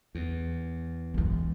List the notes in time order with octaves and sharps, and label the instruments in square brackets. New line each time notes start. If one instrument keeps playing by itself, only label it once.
[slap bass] E2
[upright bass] E3 G#3